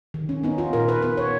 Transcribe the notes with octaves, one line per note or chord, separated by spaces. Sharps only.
D#3
C#4
B3 D#4
F4
A#2 A#4
B4
B3 B4
C#5